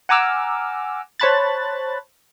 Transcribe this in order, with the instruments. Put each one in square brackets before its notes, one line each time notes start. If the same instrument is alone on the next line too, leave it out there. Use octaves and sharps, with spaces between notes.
[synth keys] F#5 G#5 A#5 D6 E6 F6
C5 C#5 A5 B5 F#6 A6